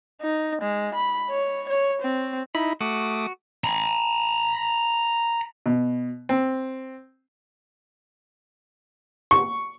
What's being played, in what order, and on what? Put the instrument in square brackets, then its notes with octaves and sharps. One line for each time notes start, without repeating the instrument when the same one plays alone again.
[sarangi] D#4
G#3
B5
C#5
C#5
C4
[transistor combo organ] D#4 E4 [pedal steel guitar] B5
[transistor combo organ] A3 D6 D#6 [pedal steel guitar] F#4
[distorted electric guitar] A#5 B5
[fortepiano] B2
C4
C#6